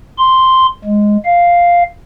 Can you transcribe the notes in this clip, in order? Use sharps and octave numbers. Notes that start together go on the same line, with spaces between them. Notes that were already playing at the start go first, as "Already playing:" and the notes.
C6
G#3
F5